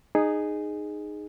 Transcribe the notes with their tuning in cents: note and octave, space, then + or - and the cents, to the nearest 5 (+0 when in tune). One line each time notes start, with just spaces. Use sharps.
D#4 -20 G#4 -5